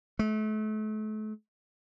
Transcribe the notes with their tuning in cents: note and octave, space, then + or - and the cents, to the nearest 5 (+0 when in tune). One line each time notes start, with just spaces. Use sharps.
A3 -35